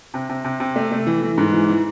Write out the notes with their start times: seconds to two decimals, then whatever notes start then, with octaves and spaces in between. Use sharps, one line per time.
0.14 C3
0.29 C3
0.44 C3
0.60 C3
0.76 A3
0.91 A3
1.07 E3
1.22 E3
1.38 G#2
1.53 E3
1.69 E3